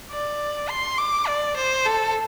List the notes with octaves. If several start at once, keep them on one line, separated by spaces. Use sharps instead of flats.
D5
C6
D6
D5
C5
A4